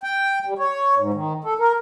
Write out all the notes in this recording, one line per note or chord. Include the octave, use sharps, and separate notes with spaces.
G5
G3
C#5
G#2
D#3
A4
A#4